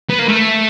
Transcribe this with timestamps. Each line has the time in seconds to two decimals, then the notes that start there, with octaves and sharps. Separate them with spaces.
0.10 B3
0.19 A#3
0.28 A3